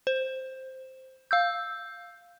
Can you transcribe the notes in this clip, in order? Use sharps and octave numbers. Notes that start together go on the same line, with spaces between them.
C5
F5 E6 G6